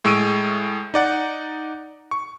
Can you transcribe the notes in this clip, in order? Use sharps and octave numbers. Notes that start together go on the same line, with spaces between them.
A2 G#3 C#6 E6 D7 D#7
D#4 D5 F#5
C#6